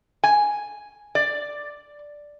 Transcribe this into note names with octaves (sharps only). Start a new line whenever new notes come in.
G#5
D5